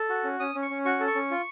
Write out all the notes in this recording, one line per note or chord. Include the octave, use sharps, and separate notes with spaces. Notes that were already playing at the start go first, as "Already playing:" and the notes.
Already playing: A4
F#4
C#4
C#4 D#6
C#4
C#6
C#4
F#4 C#6
A4
C#6
C#4
F4